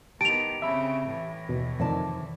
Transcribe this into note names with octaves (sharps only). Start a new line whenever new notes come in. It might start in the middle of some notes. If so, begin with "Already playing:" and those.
D#3 B3 G4 A5 D7 F7
C#3 C4 E5 B5
A2 E3
D#2 B2
F2 C3 D#3 D5 A5